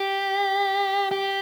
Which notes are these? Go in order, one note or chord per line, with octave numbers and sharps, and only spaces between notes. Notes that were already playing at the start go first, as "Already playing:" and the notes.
Already playing: G4
G4